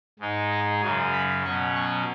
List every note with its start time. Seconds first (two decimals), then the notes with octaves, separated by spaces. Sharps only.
0.19 G#2 G#3 D#4
0.51 D#5
0.81 F#2 C#3 F#3 G#5
1.13 B5
1.44 B2 F#3 C#4 C#6
1.75 C#6